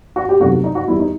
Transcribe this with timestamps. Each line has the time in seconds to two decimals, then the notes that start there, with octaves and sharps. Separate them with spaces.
0.16 F#4
0.29 G4
0.40 E2 C3 D#3 F#3 A3 F#4
0.64 D#4
0.75 F#4
0.88 E2 D#3 G3 E4
1.00 D#4